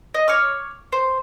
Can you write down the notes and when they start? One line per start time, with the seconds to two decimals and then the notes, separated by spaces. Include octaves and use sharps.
0.14 D#5
0.28 C#5 D6 F6
0.92 C5